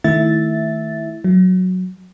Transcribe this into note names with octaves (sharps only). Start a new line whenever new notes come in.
D#3 A3 E4 E5 A6
F#3